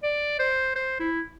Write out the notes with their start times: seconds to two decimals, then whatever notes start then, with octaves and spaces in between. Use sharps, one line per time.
0.03 D5
0.40 C5
0.76 C5
1.00 E4